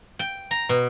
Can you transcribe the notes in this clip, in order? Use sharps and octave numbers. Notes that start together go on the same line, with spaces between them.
G5
A#5
B2